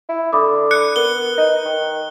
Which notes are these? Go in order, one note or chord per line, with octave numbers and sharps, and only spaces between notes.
E4
D3 B5 D6 D#6
F#6 C#7
B3 A#4 G7
D#4
D#3